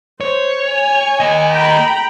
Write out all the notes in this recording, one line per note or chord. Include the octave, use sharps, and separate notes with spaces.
C5 C#5
G#5
A#3 D#5
G5 A#5 B5